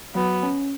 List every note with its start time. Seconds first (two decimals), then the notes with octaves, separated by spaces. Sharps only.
0.15 F#3 B3
0.43 C#4